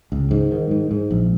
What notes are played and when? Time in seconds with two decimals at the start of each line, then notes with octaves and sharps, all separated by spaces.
0.12 C#2
0.31 G#2
0.52 D#3
0.71 G#2
0.91 G#2
1.11 A#1